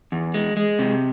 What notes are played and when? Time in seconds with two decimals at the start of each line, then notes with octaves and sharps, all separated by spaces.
0.12 E2
0.34 G#3
0.57 G#3
0.79 C3